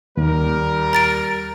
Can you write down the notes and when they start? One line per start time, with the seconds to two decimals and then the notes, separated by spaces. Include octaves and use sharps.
0.17 D#2 G3 A#4
0.93 A#5 A6 D7